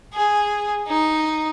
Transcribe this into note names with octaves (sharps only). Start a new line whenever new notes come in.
G#4
D#4